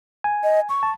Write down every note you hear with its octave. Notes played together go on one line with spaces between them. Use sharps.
G#5
D#5
C#6
A5